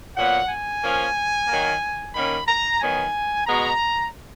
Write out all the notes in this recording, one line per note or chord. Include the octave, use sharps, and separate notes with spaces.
A#2 F#3 B3 F#5
G#5
F3 A#3 C#4
D#3 F#3 A#3
D#3 A#3 C#4 B5
A#5
D#3 F#3 B3 G#5
B2 G#3 B3 A#5